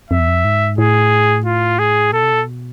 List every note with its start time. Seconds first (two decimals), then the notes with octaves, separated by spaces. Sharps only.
0.10 F2 E5
0.19 E2
0.28 F2
0.45 G#2
0.78 A2 G#4
1.46 F4
1.79 G#4
2.13 B2 A4
2.23 C3
2.33 B2